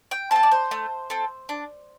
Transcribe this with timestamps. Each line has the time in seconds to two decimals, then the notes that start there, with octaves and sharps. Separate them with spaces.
0.11 G5
0.31 C4 A4 A5
0.43 D5
0.51 C5
0.71 A3
1.10 C4 A4
1.49 D4